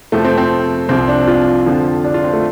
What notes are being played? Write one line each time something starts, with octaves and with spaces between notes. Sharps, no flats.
F2 C3 F3 A3
C4
C4
C2 C3 F3 C4
D4
F4
F2 D3 F3
D4
F4
C4
A3